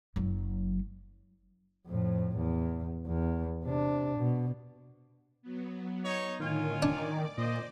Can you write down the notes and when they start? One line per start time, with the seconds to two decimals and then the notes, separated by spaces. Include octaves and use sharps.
0.16 F#1 F#3
1.88 F2 A2
2.36 E2
3.06 E2
3.64 C3 D4
4.17 B2
5.42 F#3 B3
6.04 D#4 C#5
6.40 A2 D3 D#3 F4 C#5 G#5
6.83 D4 D5 D6
7.38 A#2 C5 D#5